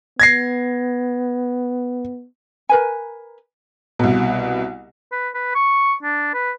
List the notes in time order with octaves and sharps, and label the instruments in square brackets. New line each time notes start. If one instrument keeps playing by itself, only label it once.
[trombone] B3 [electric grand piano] G#6 A#6 C7
[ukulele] A#4 B4 G#5
[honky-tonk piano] C2 B2
[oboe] B4
B4
C#6
D4
B4